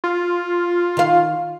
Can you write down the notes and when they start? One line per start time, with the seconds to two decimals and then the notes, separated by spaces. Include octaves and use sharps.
0.04 F4
0.97 D#3 F5